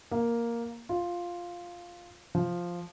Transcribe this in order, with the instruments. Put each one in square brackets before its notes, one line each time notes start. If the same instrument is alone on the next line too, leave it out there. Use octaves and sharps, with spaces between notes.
[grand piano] A#3
F4
F3